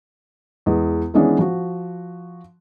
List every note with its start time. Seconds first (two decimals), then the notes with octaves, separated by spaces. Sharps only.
0.66 E2 G#3
1.14 D#3 E3 G#3 B3 C#4 D4
1.39 F3 F#4